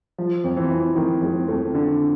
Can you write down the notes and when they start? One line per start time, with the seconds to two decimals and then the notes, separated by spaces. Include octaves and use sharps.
0.18 F3
0.44 F2
0.57 E3
0.71 F2
0.95 F2 D#3
1.22 F2 G#3
1.48 F2 A3
1.74 D3